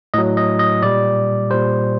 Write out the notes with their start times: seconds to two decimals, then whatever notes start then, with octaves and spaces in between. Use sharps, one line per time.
0.14 A2 F#3 D#5
0.37 D#5
0.59 D#5
0.82 A#2 G3 D5
1.50 A#2 G3 C5